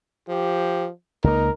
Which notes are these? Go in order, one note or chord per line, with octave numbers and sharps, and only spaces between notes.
F3 G4
C#2 A#3 D#4 A#4